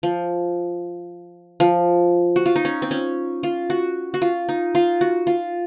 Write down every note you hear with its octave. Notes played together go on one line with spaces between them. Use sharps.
F3
F3
F#4
F4
D#4
C#4
C4
C#4
F4
F#4
F#4
F4
D#4
F4
F#4
F4